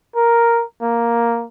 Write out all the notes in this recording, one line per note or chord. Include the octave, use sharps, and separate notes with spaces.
A#4
A#3